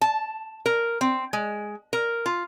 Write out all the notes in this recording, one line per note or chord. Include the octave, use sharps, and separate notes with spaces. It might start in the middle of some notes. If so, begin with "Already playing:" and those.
A5
A#4
C4
G#3
A#4
F4